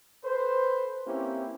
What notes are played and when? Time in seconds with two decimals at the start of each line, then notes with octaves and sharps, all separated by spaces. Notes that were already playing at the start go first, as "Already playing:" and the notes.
0.24 A4 B4 C5
1.07 A#3 C4 C#4 E4 G4